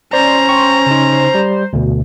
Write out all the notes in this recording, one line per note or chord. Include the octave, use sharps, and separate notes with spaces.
C#4 C5 D5 A#5
G5 C#6
C#3 D#4
G3
D2 B2